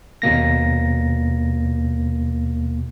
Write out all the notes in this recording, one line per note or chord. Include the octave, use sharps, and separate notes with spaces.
D#2 B2 A#3 A#6